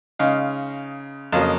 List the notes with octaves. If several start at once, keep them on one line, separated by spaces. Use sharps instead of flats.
C#3 G#3 D#4 F5
F2 C#3 F#3 A#3 F5
D#5